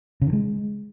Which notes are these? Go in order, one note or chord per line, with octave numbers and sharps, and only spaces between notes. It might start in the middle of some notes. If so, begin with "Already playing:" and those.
C#3
D#3
G#3